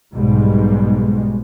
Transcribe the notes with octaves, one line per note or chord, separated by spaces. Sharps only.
B1 G#2 B2 G3 G#3